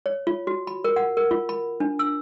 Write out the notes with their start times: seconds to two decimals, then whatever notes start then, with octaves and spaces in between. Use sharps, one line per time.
0.06 C#5
0.27 F4
0.47 F#4
0.67 B5
0.84 A#4
0.96 F#5
1.17 A#4
1.31 F4
1.49 B5
1.80 D4
1.99 E6